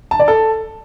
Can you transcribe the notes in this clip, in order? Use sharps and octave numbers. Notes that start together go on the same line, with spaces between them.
A5
D5
A4